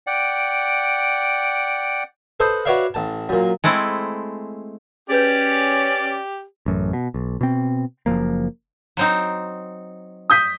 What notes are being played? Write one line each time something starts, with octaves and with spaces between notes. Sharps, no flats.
D5 F#5 G5
A4 B4 C5 D#5 B5
F#4 B4 C#5 D5 E5 F5
A1 A5
F#2 A#2
G#3 A3 C4 E4
C#4 G4 G#4 B4 D5 G6
A1 F#2
B2
B1
B2 C4
F#1 D#2 F3 A#3
F#3 C4 D#4
D#6 G6 B6